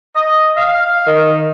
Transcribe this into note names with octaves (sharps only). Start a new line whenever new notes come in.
D#5
F5
D#3